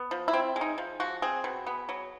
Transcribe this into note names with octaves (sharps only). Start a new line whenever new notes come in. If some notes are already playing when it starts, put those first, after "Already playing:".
Already playing: B3
F3
E4
C4
G#3
D#4
F3
F3 F#4
C4 G#4
B2
B3
F#3